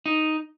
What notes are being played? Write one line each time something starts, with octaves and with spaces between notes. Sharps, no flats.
D#4